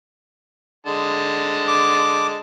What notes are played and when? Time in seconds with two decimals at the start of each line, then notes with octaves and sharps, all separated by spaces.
0.87 D3 G#3 A5
1.68 D6